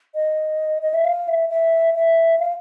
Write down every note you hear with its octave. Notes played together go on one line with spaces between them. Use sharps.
D#5
D#5
E5
F5
E5
E5
E5
F5